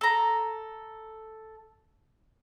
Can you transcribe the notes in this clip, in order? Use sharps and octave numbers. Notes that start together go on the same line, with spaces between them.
A4 A#5